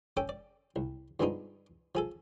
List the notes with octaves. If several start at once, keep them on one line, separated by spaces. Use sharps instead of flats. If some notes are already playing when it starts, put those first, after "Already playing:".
C#4 A4 G5 D6
D5
C2
G2 F3 G#3 B3 D4 D#4
F3 G#4 A4